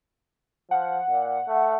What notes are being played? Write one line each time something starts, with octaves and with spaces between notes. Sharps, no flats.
F3 F#5
A#2
A3